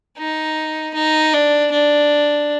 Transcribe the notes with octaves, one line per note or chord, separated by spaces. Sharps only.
D#4
D#4
D4
D4